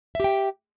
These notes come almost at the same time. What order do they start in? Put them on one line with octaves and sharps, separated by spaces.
E5 G4 G5